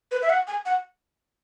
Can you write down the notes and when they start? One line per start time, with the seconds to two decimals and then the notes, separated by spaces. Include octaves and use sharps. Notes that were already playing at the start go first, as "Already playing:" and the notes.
0.11 B4
0.22 E5
0.29 F#5
0.47 G#5
0.66 F#5